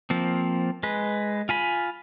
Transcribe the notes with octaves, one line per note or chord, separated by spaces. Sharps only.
F3 A#3 C4
G#3 B4
F4 G#5 B5